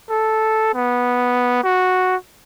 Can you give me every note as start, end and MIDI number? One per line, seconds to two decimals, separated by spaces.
0.10 0.71 69
0.75 1.60 59
1.64 2.16 66